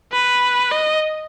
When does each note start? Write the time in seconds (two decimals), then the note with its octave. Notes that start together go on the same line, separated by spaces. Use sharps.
0.13 B4
0.71 D#5